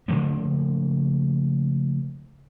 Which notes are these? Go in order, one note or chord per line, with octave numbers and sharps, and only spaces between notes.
C#3 F3 A3 A#3